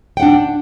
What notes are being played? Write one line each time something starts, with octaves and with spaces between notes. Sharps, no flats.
D4 F#5 G5